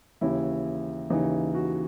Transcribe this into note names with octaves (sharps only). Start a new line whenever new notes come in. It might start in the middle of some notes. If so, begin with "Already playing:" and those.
D#2 C#3 E3 E4
D#2 C#3 E3 D#4
F#4